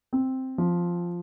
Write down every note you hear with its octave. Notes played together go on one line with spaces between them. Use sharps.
C4
F3